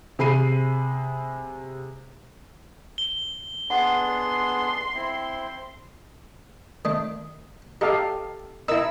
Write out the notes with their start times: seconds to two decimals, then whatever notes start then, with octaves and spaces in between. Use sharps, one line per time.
0.19 C3 G#4 B5 C7 D#7
2.98 G7
3.70 B3 D4 G#4 F#5 C6
4.95 C4 E4
6.85 D#3 A3 D4
7.81 D#4 G4 A4 F5
8.68 D#4 E4 A#4 E6